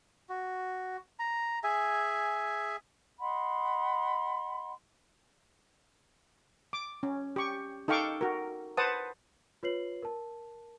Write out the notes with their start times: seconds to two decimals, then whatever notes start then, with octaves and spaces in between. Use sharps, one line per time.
0.29 F#4
1.19 A#5
1.64 G#4 E5 G#5
3.21 D#5 F#5 B5 C6
6.73 D6
7.03 C#4
7.36 G4 C#6
7.88 D#4 A4 F5 G5 C#6 D6
8.21 F#4 A#4
8.77 B4 C5 F#5 A5 D#6
9.63 F4 B4 C#5 C7 F#7
10.02 A#4 A5